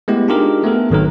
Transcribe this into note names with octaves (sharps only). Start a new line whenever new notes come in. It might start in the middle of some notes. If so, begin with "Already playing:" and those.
G#3 A3 B3 E4 G4
D4 D#4 F4 G4 G#4 A#4
A3 B3 A4 A#4
G#1 D#3 F#3 A#4